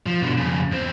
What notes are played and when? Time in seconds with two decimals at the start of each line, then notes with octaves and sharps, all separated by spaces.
0.06 F3
0.22 B2 D3
0.37 F2 C#3
0.72 E2 C4